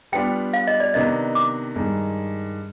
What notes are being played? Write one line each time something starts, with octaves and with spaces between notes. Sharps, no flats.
G3 B3 D4 F4 G5
F5
D#5
D5
C3 D#3 B3 D4 D#5
D6
G2 D#3 G#3